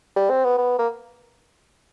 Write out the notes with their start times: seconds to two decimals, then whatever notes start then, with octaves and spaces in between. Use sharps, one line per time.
0.16 G3
0.30 C4
0.45 B3
0.58 B3
0.79 A#3